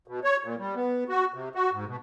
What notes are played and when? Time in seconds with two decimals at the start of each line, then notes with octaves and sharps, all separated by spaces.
0.08 B2
0.24 C#5
0.44 A#2
0.59 G3
0.75 B3
1.09 F#4
1.34 C3
1.55 F#4
1.73 G#2
1.87 B2